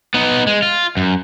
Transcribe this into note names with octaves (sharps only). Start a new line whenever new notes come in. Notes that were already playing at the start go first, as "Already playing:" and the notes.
B3 D#4
G#3
F4
F#2